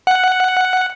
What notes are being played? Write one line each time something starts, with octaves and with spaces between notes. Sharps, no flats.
F#5